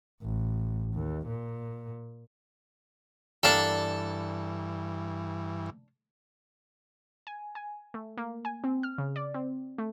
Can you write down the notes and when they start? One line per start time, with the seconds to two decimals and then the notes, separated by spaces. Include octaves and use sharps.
0.22 A1
0.94 D#2
1.27 A#2
3.43 G2 E3 G3 A#3 D4 A4 A5
7.27 G#5
7.55 G#5
7.94 A3
8.17 A#3
8.45 G#5
8.64 C4
8.83 F6
8.98 C#3
9.16 D5
9.34 C4
9.78 A3